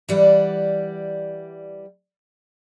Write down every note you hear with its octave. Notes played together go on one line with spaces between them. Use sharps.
E3 G3 D5 F#5